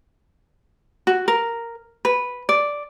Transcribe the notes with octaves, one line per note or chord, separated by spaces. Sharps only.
F#4
A#4
B4
D5